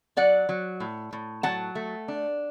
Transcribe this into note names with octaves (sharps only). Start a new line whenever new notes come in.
F#3 D5 F#5
F#3
A2
A2
F#3 F#5 A5
A3
D4